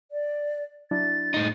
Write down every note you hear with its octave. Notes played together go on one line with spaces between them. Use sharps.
D5
F#3 D4 E4 A6
A2 D#4